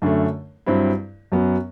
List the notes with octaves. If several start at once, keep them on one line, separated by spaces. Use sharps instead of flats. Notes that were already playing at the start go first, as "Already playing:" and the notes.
F#2 D3 A3
G2 F#3 C4 E4
F#2 F#3 B3